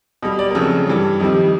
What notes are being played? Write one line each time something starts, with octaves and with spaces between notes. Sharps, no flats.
B2 G3
D5
A#4
F2 C#3 F#3 A3 A4
G2 E3 G3
F2 C3 D#3 G3